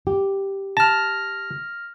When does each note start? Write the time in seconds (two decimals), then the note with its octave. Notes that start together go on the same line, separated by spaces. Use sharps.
0.07 G4
0.77 A5 F6 A#6